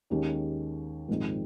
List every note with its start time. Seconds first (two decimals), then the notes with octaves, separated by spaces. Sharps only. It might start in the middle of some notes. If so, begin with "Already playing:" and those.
0.10 D#2 D#3 G#3 C#4 G4
1.09 A#1 G#2 D#3 G#3 C4